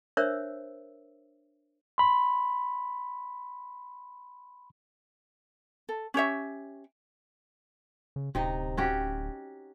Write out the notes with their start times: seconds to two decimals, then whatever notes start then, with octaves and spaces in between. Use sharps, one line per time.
0.17 D4 A#4 C5 C#5 E5 E6
1.98 B5 C6
5.89 A4
6.14 C#4 G4 C#5 E5
8.16 C#3
8.35 D1 C3 D#4 D#5
8.77 C#4 F#4 G4